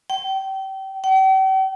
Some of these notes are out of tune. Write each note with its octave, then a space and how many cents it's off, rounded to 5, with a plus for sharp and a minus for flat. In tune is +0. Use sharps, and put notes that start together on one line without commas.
G5 -30
G5 -45